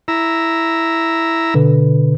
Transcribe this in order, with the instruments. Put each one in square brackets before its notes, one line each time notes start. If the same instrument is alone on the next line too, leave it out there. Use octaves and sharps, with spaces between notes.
[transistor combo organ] E4 A#5 E6
[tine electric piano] B2 D3 B4